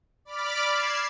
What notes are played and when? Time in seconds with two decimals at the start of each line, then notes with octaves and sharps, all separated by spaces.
0.25 D5 B5 D6 F6
0.71 G#6 C7 E7